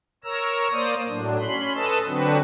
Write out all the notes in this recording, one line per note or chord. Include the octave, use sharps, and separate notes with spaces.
A#4 C#5 A#5 E6
A#3 C5 D5 D#6
A2 F#3 D4
C#4 B5 C6
A4 B4 D#5 A5 E6
D3 F#3 C4 D4 F#4 B4